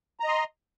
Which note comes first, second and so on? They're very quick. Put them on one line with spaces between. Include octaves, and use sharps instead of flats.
A#5 D#5 C6